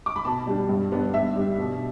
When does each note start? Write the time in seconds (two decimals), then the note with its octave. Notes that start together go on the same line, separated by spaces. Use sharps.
0.06 D6
0.16 B5
0.25 B2 A5
0.47 G3 D4
0.69 G2
0.91 G3 B3 D4
1.14 G2 E5
1.36 G3 D4
1.58 B2